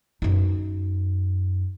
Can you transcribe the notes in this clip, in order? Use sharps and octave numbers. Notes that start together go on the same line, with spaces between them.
F#2 D#4